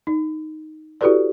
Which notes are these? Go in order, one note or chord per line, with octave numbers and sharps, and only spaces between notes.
D#4
E4 F#4 G4 A4 B4 D5